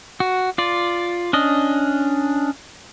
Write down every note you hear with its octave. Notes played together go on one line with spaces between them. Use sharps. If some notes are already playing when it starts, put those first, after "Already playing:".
F#4
F4 D5
C#4 D4 D#5